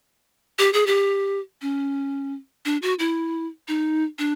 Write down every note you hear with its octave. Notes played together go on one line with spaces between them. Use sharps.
G4
G#4
G4
C#4
D4
F#4
E4
D#4
D4